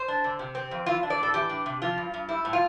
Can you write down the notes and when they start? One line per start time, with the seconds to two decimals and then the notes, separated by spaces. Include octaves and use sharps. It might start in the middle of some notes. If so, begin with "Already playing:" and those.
Already playing: C5
0.08 D4
0.24 D3
0.39 C3
0.55 C4
0.71 F2
0.86 E3 F4
1.03 D4
1.10 D5
1.18 A2 A4
1.34 E3 G4
1.49 D4
1.66 C3
1.82 F3 F4
1.98 G2
2.14 G2
2.29 G3 E4
2.45 A2
2.53 F4